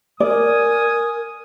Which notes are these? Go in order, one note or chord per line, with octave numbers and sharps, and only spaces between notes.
A#4 D5 G#5 D#6